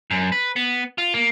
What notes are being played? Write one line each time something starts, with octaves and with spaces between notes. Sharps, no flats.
F#2
B4
B3
F4
A#3